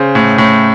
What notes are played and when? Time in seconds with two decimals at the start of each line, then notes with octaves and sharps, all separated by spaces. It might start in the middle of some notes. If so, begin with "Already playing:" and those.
Already playing: C#3 C5
0.15 A2
0.38 A2